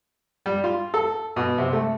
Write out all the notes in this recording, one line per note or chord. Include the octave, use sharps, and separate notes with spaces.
G3
F4
A4
B2
C3
A3